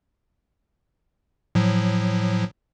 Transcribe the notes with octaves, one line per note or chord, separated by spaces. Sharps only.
A2 F3 F#3